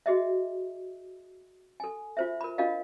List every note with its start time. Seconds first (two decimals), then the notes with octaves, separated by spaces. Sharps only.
0.06 F#4 G#4 D#5 E5
1.80 A4 G#5
2.17 F4 C5 E5
2.41 A#4 B5
2.58 D4 F4 A#4 D#5 F5